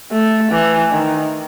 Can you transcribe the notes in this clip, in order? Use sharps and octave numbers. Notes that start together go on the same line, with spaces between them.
A3
E3
D#3